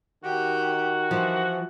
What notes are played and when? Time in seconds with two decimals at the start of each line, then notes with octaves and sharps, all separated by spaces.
0.24 D#3 F#4 G4
1.11 E3 F3